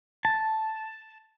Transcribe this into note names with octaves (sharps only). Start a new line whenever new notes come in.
A5